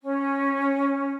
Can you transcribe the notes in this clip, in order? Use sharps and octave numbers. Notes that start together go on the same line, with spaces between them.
C#4